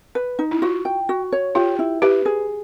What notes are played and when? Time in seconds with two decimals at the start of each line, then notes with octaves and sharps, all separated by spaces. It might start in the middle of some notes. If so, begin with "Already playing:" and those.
0.15 B4
0.39 D#4
0.51 E4
0.62 F4 F#4
0.85 G5
1.09 F#4
1.32 C#5
1.55 F4 G4
1.79 E4
2.02 G4 B4
2.25 G#4